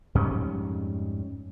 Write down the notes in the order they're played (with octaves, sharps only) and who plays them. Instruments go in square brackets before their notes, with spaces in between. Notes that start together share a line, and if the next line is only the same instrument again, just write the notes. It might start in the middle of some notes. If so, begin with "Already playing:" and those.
[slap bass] F2 G#2 G3 C#4